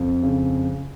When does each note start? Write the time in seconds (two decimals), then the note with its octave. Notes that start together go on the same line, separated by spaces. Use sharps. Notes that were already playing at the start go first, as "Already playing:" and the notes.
Already playing: F2
0.23 C#3